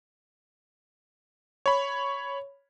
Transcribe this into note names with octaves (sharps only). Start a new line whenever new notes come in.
C#5 B5